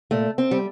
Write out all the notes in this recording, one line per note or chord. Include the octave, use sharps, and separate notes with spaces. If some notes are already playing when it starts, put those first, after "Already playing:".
A#2 A3
C4
G3